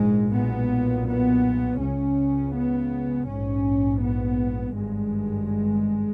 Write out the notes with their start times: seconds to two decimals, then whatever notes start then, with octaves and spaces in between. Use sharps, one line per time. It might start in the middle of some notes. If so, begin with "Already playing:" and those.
Already playing: A#1 G#2 G#3
0.35 B1 A#2 B3
1.08 B3
1.81 C#2 C#3 C#4
2.55 B3
3.28 A#1 G#2 C#4
4.01 B3
4.74 G#1 G2 G#3